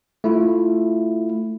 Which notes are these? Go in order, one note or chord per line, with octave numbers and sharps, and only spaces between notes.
A3 E4 F4